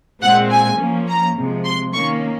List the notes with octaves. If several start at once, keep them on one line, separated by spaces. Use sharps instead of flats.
A#2 G#3 C4 F#5
G#5
F3 A#3 C#4
A#5
C3 F3 G#3
C6
D#3 A#3 C#4 C#6